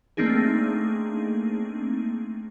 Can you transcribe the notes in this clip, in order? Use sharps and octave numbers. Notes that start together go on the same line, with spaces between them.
A3 A#3 C4 D4 D#4 G#4